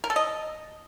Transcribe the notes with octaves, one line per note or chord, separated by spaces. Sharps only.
A#4
A4
D#5